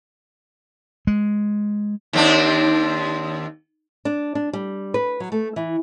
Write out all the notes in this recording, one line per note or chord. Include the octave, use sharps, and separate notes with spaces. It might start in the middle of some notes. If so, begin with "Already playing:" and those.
G#3
D#2 C4 D4
D4
D4
G3
B4
F#3
A3
E3